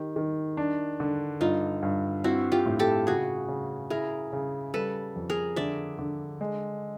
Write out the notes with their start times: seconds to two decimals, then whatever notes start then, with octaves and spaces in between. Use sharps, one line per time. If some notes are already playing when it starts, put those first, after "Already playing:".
Already playing: D#3 G4
0.16 D#3
0.57 D4
1.00 D3
1.41 G2 D#4 F4
1.83 G2
2.24 C4 E4 F#4
2.52 F4 G4
2.66 A2
2.79 G4 A4
3.07 C#3 F#4 G#4
3.48 C#3
3.90 E4 G#4 A#4
4.33 C#3
4.74 G3 A4 B4
5.16 F2
5.30 G#4 A#4
5.56 D3 D5 E5
5.99 D3
6.41 G#3